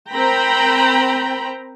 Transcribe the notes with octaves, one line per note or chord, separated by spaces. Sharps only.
C4 A#4 C5 G5 A#5 B5